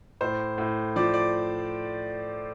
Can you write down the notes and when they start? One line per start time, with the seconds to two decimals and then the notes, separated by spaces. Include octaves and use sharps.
0.21 A2 C5
0.58 A2
0.96 F3 D5
1.14 D5